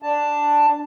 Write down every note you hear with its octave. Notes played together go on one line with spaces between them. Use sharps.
D4 A5